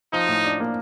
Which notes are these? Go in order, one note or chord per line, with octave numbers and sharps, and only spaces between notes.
F3 D#4
A2
D4
A#3